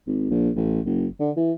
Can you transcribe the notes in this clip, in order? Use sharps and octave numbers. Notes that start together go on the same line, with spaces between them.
G#1
A#1
A1
F#1
D3
E3